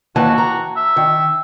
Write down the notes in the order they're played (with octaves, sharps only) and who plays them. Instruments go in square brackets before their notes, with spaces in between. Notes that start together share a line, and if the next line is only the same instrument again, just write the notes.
[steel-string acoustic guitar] D#2 E3 A5 [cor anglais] F#4
[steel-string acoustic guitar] A#5
[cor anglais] E5
[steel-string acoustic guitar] D#3